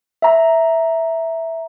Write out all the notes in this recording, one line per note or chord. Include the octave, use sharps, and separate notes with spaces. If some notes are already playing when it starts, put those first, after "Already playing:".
E5 A#5